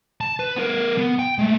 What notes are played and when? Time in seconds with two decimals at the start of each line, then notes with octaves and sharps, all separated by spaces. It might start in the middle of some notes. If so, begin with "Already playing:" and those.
0.21 A5
0.40 B4
0.56 B3 A#4
0.98 B3
1.19 G5
1.39 G#3 A3